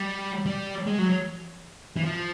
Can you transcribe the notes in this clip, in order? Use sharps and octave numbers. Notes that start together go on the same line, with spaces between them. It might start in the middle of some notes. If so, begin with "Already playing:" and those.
Already playing: G3
G3
G#3
F#3
E3
F3